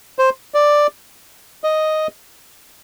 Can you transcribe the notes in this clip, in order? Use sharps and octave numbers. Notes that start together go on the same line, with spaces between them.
C5
D5
D#5